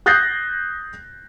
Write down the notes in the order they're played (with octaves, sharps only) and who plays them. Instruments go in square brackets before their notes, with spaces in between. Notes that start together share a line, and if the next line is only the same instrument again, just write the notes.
[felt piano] D#6 F#6 G6 A6 A#6 C7